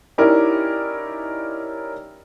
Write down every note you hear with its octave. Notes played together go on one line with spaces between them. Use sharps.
C#4 D#4 E4 G4 A#4 D5